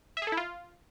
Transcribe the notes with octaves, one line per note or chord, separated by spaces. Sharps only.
E5
G#4
A4
E4
F4